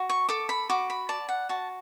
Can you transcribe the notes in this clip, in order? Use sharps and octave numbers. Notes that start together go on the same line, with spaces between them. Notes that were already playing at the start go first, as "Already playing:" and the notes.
Already playing: F#4
C#6
A4 D6
B5
F#4 D6
B5
D5 A5
F#5
F#4 A5